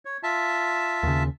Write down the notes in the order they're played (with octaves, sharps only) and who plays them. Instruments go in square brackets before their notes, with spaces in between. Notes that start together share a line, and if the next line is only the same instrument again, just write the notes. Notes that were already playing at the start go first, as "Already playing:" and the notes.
[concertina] C#5
F4 E5 A5
[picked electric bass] D#2 C#3